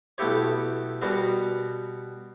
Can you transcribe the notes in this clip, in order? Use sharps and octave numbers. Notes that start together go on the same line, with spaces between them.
B1 A3 B3 E4 G4 C#5
B2 G3 B3 F#4 A#4